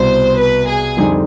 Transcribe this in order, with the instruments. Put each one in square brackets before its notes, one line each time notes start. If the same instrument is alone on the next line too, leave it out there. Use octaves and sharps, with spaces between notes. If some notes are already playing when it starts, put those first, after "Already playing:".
Already playing: [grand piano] C2 B2 B3 [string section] C5
[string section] B4
G#4
[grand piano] F2 D3 G3 C4 D#4